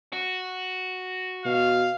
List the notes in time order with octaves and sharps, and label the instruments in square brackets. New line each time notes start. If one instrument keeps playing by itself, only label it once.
[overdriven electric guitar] F#4
[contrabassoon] B2 [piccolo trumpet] F5